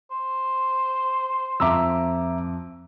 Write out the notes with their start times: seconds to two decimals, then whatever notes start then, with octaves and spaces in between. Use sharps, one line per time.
0.11 C5
1.60 F2 E5 A#5 D6 E6